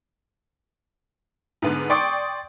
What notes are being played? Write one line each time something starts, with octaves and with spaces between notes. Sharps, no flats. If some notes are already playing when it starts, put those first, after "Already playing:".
G#2 D3 B3
D5 G5 C6 C#6 D#6 D7